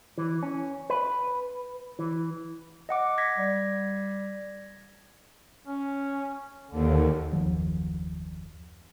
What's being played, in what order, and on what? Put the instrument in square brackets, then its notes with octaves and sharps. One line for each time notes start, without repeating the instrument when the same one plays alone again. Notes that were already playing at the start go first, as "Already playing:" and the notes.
[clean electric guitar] E3
C#4
B4
E3
[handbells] D#5 F#5 D6
G#6 A#6 B6
[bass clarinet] G3
[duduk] C#4
[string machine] D#2 [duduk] D3
[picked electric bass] F#1 D#2 D#3 F3